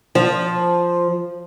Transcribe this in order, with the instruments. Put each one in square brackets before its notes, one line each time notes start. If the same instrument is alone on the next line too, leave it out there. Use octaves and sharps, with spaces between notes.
[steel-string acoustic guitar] F3